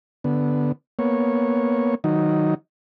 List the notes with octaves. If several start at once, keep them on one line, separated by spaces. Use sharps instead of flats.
D3 B3
A#3 B3 C#5
D#3 F#3 D#4